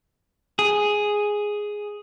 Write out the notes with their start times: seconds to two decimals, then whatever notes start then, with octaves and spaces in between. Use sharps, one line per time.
0.59 G#4